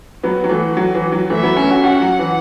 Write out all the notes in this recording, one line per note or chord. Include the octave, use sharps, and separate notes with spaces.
F#3 B3 F#4
F#3
E3 A3
F#3
E3
F#3
E3 A3 E5
F#3 B3
A3 C#4
C#4 F#4
C#4 F#4 F#5
F#3
E3